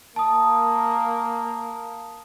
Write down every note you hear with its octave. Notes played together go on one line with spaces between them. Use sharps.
A#3 A5 D#6